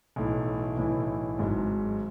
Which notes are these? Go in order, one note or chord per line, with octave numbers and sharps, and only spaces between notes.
B1 A2 E3
B1 A2 E3
G#1 G#2 F#3